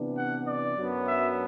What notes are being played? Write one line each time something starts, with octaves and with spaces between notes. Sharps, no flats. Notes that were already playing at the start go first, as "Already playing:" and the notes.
Already playing: C3 E3 B3 D4
F#5
D5
F#2 F#3 B3 D4
E5